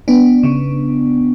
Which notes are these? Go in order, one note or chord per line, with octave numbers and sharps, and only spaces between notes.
B3 D4
C#3